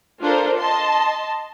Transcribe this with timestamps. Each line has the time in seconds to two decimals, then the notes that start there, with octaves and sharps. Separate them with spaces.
0.22 D4 F4 A4 A#4 C5
0.58 D#5 A5 C6